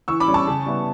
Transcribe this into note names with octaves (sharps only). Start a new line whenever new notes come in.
E3 C#6 E6
B5 D6
G3 C#4
A5 C#6
C#3
G3 B3 E4